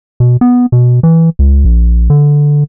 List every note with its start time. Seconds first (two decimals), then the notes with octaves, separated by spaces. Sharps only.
0.20 B2
0.41 B3
0.72 B2
1.03 E3
1.39 C#2
1.65 A#1
2.10 D3